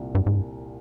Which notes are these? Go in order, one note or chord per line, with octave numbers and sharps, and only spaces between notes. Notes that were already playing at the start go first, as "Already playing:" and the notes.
Already playing: C2 A#2
G2
G#2
G2